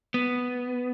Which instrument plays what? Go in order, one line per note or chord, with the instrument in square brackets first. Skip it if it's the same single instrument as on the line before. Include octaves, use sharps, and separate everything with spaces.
[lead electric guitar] B3